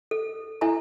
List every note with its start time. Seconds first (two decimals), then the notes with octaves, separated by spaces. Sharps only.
0.11 A4
0.61 E4 A4 E5 G#5 A#5